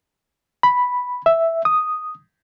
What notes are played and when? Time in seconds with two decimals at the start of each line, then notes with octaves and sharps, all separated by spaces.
0.63 B5
1.26 E5
1.65 D#6